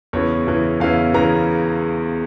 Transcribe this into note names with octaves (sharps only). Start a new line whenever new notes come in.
E2 C#3 E3 C#5
E2 C#3 E3
E2 C#3 E3 F5
E2 C#3 E3 A#5